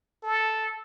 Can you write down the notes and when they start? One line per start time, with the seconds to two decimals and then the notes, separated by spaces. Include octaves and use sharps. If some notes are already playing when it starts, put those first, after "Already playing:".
0.23 A4